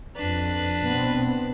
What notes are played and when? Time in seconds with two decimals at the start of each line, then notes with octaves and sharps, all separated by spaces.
0.16 F2 D4 B4
0.86 B2 B3 C4